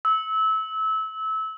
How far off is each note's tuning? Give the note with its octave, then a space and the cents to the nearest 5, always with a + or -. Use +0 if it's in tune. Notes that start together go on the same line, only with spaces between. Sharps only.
E6 -25